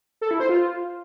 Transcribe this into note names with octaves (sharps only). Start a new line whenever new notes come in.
A4
E4
C5
F4